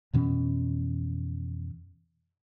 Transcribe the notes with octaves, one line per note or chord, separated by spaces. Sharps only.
F2 B2 E3 C#4